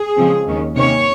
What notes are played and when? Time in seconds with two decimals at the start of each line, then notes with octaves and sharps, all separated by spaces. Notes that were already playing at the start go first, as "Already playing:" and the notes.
Already playing: G#4
0.17 C#3 F3 G#3 C4
0.46 D#2 D#3 G#3 C#4
0.75 C3 D#3 A#3 C#4 C#5